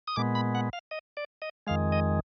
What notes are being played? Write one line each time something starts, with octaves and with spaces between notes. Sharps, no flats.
D#6
A#2 G#3 B3 D6
B5
F#5
F5
D#5
D5
D#5
F2 D#3 G#3 F5
D#5